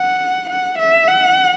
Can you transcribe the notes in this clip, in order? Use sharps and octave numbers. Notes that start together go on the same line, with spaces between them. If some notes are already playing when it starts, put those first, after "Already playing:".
Already playing: F#5
F#5
E5
F#5